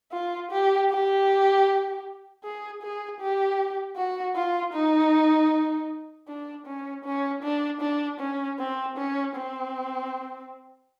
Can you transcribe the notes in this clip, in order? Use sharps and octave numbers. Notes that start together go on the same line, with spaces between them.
F4
G4
G4
G#4
G#4
G4
F#4
F4
D#4
D4
C#4
C#4
D4
D4
C#4
C4
C#4
C4